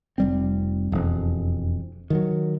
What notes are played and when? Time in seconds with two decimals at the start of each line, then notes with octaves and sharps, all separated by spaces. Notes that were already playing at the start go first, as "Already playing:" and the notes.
0.18 F1 G3 C4
0.92 E1 F2
2.10 D#3 F3 F#3